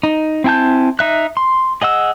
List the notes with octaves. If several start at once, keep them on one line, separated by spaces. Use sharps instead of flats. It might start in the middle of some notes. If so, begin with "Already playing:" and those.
D#4
C4 E4 G#5 A5 G6
D#4 E5 F#6
C6
G#4 D#5 F#5 E6